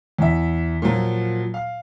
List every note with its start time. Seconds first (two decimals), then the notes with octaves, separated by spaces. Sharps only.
0.19 E2 E5
0.82 A#2 F3 F#3
1.54 F5